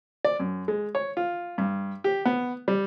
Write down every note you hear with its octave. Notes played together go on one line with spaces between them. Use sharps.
D5
F#2
G#3
C#5
F4
G2
G4
B3
G3